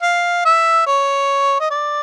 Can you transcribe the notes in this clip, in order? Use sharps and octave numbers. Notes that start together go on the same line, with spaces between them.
F5
E5
C#5
D#5
D5